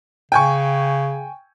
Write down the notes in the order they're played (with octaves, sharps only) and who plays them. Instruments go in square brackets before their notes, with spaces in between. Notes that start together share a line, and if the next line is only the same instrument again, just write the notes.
[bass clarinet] C#3 [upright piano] G5 G#5 C#6